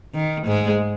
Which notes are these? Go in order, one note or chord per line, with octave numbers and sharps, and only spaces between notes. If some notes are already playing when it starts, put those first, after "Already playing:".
D#3
G#2 G#3